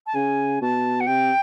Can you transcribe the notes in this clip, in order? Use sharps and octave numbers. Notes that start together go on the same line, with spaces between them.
A5
C#3 G#5
B2 A5
F#5
C3 G5